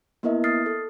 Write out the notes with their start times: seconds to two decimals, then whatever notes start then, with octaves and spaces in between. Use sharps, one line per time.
0.23 A#3 B3 E4 A#4 D#5 E5
0.44 D#6 F6 A6 C7
0.66 A4